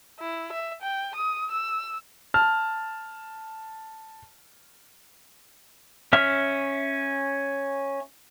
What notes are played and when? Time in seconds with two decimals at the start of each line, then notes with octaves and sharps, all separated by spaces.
0.20 E4
0.53 E5
0.82 G5
1.16 D#6
1.51 E6
2.34 A5 F6
6.13 C#4 E5 F6